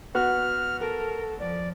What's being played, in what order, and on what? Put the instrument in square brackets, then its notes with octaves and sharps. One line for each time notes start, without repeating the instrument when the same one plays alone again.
[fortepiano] B3 F#4 [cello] F#5 [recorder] F6
[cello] A4 [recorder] A#4
[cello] F2 F3 [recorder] D5